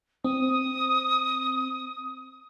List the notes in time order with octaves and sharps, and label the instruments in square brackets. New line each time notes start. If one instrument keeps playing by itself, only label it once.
[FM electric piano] C4 [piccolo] D#6